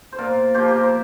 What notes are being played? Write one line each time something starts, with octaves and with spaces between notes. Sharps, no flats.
C5
A#2 F4 A#4
F3 A#3 G4 C5
G4
A#4
C5